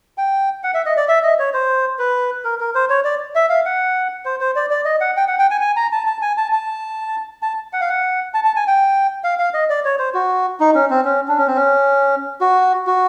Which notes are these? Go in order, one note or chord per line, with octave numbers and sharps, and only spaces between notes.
G5
F#5
E5
D#5
D5
E5
D#5
C#5
C5
B4
A#4
A#4
C5
C#5
D5
E5
F5
F#5
C5
C5
D5
D5
D#5
F#5
G5
F#5
G5
G#5
G#5
A#5
A5
A5
G#5
A5
A5
A5
F#5
F5
F#5
A5
A5
G#5
G5
F5
F5
D#5
D5
C#5
C5
F#4
D#4
C#4
C4
C#4
D4
C#4
C4
C#4
F#4
F#4